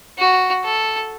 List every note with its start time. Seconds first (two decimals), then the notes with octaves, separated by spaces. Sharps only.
0.19 F#4
0.65 A4